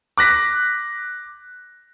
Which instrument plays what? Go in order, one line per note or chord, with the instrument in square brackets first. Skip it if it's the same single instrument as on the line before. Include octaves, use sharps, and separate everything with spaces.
[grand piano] D6 F#6 A#6 B6